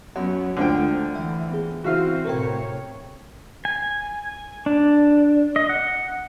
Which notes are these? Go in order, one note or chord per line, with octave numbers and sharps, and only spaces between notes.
F#2 F#3 B3 C#4 F#5
D2 D3 F3 G#3 G5
E3 E5
B3 G#4
C#3 E3 C4 E4 F#4 C5 E5 F5
A2 C3 A4 A#4 C#5 G5
G#5
D4
D#5
F#5